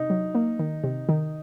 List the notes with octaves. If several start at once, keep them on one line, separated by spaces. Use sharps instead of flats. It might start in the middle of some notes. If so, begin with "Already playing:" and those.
Already playing: C3 D#4
F#3
A#3
D#3
C3
D#3